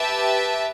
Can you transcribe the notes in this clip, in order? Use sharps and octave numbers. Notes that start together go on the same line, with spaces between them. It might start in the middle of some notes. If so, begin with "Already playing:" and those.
Already playing: G4 B4 E5 A5